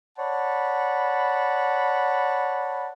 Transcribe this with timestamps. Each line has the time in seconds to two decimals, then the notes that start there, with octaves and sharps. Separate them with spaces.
0.18 C#5 D5 F#5 A5 B5